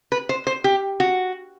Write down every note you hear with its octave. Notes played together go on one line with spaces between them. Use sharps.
B4
C5
C5
G4
F#4